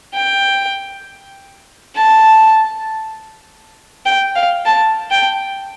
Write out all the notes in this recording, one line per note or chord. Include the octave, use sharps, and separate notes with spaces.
G5
A5
G5
F5
A5
G5